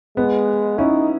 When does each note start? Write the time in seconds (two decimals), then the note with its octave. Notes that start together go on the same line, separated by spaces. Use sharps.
0.17 G#3 B3
0.78 C#4 D#4 E4